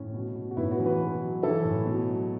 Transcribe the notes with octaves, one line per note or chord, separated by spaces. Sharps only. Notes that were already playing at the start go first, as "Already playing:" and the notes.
Already playing: A2 C#4
B2
B2
F#4
A2 B3 E4
F#4 B4
E3
F#4 B4
B2
F#3
E3 E4 A4
A2
B2
F#3